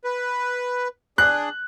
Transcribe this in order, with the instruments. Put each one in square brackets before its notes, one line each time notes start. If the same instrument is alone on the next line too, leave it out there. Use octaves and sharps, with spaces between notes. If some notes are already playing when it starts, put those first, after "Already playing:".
[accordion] B4
[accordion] D4 G#4 [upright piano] F#6